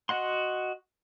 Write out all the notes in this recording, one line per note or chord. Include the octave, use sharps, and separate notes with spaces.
F#4 D#5 F#5 C6